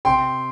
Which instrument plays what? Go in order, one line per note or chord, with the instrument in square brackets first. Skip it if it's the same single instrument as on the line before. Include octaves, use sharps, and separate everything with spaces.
[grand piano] C3 G5 C6